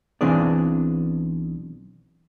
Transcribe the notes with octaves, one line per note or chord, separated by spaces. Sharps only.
B1 E3 C4 D4 G#4 D5